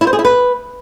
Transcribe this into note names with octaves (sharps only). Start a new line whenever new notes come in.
E4
C5
G#4
E4
B4